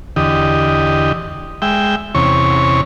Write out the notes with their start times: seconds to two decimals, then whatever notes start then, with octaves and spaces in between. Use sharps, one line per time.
0.16 E2 D3 G4 D#5
1.62 G#3 E5 G5
2.15 E2 C3 C#4 C#5